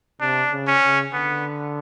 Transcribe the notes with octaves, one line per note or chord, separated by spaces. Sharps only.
C3 D4
C#3
C#4
C#3
D3 B3